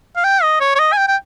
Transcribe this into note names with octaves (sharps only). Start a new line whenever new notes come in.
F5
G5
D#5
C#5
C#5
D#5
G#5
G5
G5